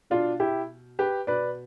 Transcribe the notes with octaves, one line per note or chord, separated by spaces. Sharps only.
B2 D4 F4
E4 G4
G4 B4
B2 B4 D5